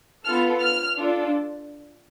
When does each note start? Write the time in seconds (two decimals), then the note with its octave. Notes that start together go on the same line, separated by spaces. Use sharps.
0.25 B3 F4 A4 F6
0.62 F6
0.98 D4 F4 A4